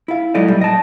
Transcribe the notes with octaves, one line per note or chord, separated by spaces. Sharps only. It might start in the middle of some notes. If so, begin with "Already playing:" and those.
E4 F5
F#3 G#3 E4 A4 D5 D#5
A#2 G3
D#5 A5